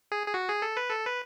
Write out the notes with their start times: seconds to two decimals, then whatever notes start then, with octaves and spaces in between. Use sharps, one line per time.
0.12 G#4
0.27 G#4
0.34 F#4
0.48 G#4
0.62 A4
0.77 B4
0.90 A4
1.05 B4